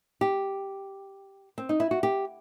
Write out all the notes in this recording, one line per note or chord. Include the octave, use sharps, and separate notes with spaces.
G4
C4
D#4
E4
F#4
G4